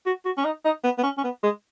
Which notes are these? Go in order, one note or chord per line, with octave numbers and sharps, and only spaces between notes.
F#4
F#4
C#4
D#4
D#4
B3
B3
C#4
C#4
B3
G#3